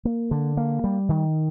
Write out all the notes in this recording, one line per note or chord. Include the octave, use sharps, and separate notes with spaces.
A#3
D3
A#3
G3
D#3